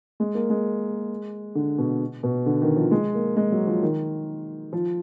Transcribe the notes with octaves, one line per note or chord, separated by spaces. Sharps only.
G#3
A#3
G#3
D3
B2
B2
D3
D#3
F3
G#3
A#3
G#3
F#3
F3
D#3
F3